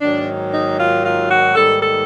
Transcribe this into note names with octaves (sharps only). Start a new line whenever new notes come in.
G#2 D#3 F#3 A#3 D4
D#4
F4
F4
F#4
G#2 D#3 G3 A#3 A4
A4